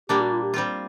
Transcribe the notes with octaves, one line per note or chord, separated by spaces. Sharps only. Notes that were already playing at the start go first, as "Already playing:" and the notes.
A#2 G3 A#3 D4 G4
F#4
F4
G4
G3 C4 F4